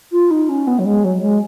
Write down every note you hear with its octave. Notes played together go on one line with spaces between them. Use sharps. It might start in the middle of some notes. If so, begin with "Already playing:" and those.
F4
D#4
C#4
B3
F#3
G#3
F#3
G#3